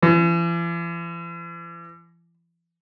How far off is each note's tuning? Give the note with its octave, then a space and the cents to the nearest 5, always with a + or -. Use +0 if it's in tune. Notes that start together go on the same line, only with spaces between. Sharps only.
E3 +45